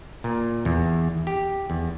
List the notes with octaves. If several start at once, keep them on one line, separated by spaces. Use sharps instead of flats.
A#2
E2
G4
E2